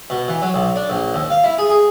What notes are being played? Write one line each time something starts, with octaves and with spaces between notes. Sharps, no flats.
B2
E3
F#3
B1
D4
A#1
D#2
F5
E4
G#4
G#4